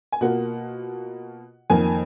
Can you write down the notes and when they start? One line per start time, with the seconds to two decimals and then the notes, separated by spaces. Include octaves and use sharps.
0.12 G#5
0.21 B2 A#3 F4 F#5
1.70 F2 D#3 A#3 G#5